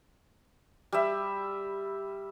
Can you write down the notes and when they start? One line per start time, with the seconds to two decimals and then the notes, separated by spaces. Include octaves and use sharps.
0.93 G3 E5